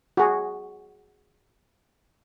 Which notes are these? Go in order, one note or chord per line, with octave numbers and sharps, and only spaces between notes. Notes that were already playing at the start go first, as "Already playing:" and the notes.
F#4 G#4